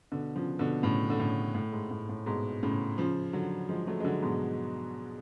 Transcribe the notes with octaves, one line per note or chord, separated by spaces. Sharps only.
B2 D3
C#3 F3
B2 D3
A2 C#3
D3
A2 C#3
A2
G#2
A2
A2
G#2 B2
A2 C#3
C#3 F3
D3 F#3
F3 G#3
F#3 A3
G#3
D3 F#3
G#2 B2